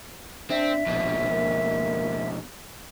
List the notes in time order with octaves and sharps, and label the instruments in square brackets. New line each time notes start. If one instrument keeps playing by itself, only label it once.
[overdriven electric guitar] C4 [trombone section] D4 [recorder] E5
[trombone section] A#1 [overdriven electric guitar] F2 B2
[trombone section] D2 A#3